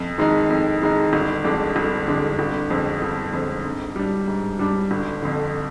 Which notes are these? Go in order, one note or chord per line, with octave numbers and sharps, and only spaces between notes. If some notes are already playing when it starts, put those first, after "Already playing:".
Already playing: F2
D#3 G#3 D#4
F2
D#3 G#3 D#4
G1
F2 D3 G#3 D4
G1
F2 D3 G#3 D4
G1
F2 D3 G#3 C4
G1
F2 D3 G#3 C4
G#2
G3 D4
G#2
G3 D4
G1
F2 D3